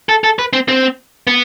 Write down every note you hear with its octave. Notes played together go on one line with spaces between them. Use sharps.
A4
A4
B4
C4
C4
B3